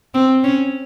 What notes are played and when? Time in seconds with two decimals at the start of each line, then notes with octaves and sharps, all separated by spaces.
0.14 C4
0.44 C#4